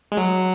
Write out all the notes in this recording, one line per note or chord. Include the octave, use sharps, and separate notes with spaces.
G#3
F#3